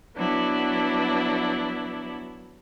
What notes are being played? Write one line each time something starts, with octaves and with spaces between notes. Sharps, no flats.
F#3 B3 D4 E4